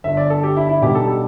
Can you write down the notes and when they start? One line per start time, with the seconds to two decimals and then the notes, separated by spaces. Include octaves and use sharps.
0.04 G1 G2 D3 E5
0.17 D5
0.30 A4
0.43 G4
0.57 E4
0.69 E4
0.82 B1 B2 G3 B3 D4 G4
0.95 A4
1.07 G4